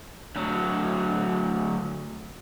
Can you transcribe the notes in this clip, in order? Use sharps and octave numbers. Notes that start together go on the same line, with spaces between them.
D2 F#3